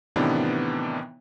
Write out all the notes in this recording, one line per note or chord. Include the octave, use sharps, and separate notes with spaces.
A2 C3 D#3 E3 B3 D4